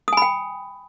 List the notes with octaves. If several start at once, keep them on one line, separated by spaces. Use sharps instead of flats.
G5 G#5 B5 D#6